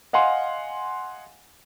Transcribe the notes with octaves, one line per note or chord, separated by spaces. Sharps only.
D#5 F5 F#5 G#5 C6